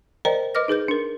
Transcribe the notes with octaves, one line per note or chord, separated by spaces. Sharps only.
A#4 C5 D5 D#5 G5 A#5
B4 D#5 D6 F6 A#6
D#4 G#4 B4 G6
D4 A#4